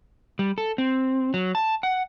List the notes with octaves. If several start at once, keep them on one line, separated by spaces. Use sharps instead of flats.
G3
A4
C4
F#3
A5
F#5